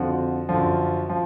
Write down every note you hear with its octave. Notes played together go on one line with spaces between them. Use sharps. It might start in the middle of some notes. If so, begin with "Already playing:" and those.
Already playing: F2 D3 F3 F#4
F#2 D3 F3
F3